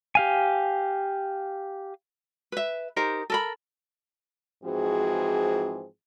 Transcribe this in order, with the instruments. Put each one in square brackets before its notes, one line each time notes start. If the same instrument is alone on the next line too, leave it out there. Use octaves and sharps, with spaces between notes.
[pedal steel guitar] G4 F5 G#5
[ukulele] B4 E5
D#4 G4 A#4 C5
A4 A#4 B5
[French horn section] G#2 E3 F3 C4 F#4 G#4